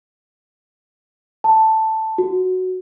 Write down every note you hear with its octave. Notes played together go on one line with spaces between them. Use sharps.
A5
F#4